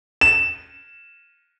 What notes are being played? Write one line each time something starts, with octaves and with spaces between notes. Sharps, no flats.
E7